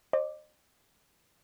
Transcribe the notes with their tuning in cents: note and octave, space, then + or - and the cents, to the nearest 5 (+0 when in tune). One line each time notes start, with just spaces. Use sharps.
C5 +35 D#5 -35 D6 +0